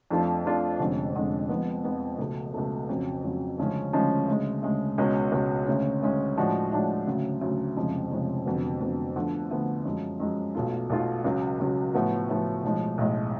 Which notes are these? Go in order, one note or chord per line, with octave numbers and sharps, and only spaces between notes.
F2 F3 A3 D4 F4
F2 F3 A3 D4 F4
F1 F2 D3 G#3 C#4
F1 F2 D3 G#3 C#4
F2 F3 G#3 B3
F2 F3 G#3 B3
C#2 B2 A3
C#2 B2 A3
F2 C#3 F#3
F2 C#3 F#3
D2 C#3 F3 G#3 C#4
D2 C#3 F3 G#3 C#4
D2 C#3 G#3
D2 C#3 G#3
C#2 B2 G#3 C#4
C#2 B2 G#3 C#4
D2 C#3 G#3 C#4
D2 C#3 G#3 C#4
A2 F3 G#3 D4 F#4
A2 F3 G#3 D4 F#4
D2 C#3 F#3
D2 C#3 F#3
F1 F2 C#3 F3 G#3
F1 F2 C#3 F3 G#3
F1 F2 D3 F#3 B3
F1 F2 D3 F#3 B3
D2 D3 F3 B3
D2 D3 F3 B3
F#2 F3 G#3
F#2 F3 G#3
B1 B2 A3 F4
B1 B2 A3 F4
C#2 C#3 F#3
C#2 C#3 F#3
A2 F3 B3 F#4
A2 F3 B3 F#4
B1 A2 F3 G#3
B1 A2 F3 G#3